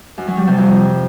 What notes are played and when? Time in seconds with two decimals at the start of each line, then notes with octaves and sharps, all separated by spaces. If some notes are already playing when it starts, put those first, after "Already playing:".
0.18 F#2
0.28 F#3
0.38 G3
0.47 C3
0.57 F2